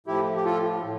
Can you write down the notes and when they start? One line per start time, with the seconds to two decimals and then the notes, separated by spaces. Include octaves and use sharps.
0.07 A2 F3 E4 G4
0.36 G4
0.45 F4 A4
0.83 A2